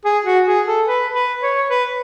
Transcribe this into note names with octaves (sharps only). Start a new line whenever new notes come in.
G#4
F#4
G#4
A4
B4
B4
C#5
B4